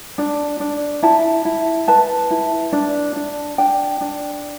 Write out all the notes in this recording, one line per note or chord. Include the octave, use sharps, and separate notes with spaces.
D4
D4
E4 A5
E4
B4 A5
E4
D4
D4
D4 G5
D4